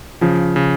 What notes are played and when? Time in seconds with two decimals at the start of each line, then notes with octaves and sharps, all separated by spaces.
0.21 C#3 F3
0.56 C#3